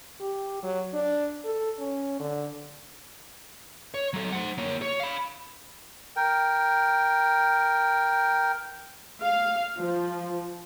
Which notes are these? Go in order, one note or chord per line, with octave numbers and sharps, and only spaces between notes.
G4
F#3
D4
A4
C#4
D3
C#5
F#3 A4
C5 F#5
A#3 C#5
C#5
F5 B5
A#4 G5
F5
F3